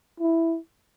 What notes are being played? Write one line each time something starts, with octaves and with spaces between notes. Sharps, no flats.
E4